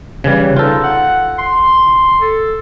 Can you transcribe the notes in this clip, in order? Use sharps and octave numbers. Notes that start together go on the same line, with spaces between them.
C#3 E3 G3
D#4 F4 A4
F#5
C6
A4